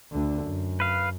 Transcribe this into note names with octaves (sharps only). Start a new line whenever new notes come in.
D2 D3
F#2
B4 F5